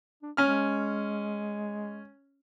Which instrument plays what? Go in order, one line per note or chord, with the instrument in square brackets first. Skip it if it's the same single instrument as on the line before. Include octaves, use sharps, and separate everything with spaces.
[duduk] D4
[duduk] G#3 [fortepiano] C#4 F6